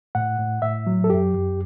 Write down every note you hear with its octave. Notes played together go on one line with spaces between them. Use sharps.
A2 F#5
A2
A2 E5
F#3
A4
F#2 G4
F#2